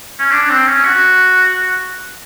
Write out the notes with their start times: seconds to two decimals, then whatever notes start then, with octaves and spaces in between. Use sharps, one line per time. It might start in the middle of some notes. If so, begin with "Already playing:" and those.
0.19 C#4
0.32 D4
0.49 C4
0.68 C#4
0.86 F#4